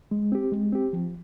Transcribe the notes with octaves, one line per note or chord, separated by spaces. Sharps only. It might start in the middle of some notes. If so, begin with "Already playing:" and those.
G#3
C4 G4
G#3
C4 G4
F3